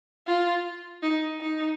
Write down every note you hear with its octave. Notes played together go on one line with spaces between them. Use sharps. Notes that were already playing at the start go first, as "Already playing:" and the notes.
F4
D#4
D#4